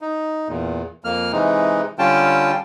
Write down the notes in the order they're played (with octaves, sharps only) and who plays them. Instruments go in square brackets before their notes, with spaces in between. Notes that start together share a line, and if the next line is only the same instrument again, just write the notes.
[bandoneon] D#4
E2 A#2
F2 A#3 F6
C3 E3 G#3 D#4
D3 G3 C#4 F4 G5 A5